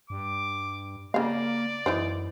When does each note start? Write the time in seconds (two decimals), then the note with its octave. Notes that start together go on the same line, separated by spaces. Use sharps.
0.10 G2 D6
1.14 C#3 A#3 D5 F5
1.86 F#2 E3 D#4 C5